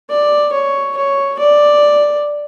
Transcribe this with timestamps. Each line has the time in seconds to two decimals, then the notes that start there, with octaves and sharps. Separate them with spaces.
0.10 D5
0.52 C#5
0.97 C#5
1.39 D5